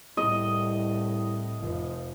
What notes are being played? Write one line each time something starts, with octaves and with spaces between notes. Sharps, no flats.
C2 A2 D#5
F1 F3